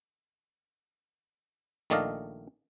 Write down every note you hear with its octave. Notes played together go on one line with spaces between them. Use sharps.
A#1 D#3 A3 D5 D#5 F5